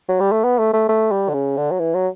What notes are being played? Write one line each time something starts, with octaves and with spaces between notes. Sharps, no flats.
F#3
G3
A3
B3
A3
A3
A3
G3
D3
C#3
D3
F#3
E3
F#3